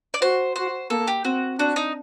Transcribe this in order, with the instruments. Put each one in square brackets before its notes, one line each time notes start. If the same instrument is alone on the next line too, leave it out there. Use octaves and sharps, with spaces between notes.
[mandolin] D5
[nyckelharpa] F#4 [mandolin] C5
[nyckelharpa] F#4 [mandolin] C5
[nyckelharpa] A#3 [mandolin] A4
[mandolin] G4
[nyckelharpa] C4 [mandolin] F#4
[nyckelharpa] D4 [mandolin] F#4
[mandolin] D#4